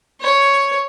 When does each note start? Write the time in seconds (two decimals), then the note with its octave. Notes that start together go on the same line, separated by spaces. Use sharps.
0.21 C#5